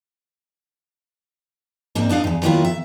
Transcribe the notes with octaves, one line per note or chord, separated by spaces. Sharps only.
G#2 A#3 C4 D4
B3 D4 D#4 F5
E2 G2
D#3 F#3 A#3 B3 E4 F4
E5